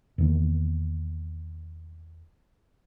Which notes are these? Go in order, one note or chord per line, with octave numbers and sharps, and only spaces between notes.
E2 D#3 A#3